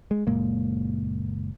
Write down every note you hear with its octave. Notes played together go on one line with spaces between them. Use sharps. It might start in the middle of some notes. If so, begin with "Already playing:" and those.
G#3
F#1 A#2 G#3 A#3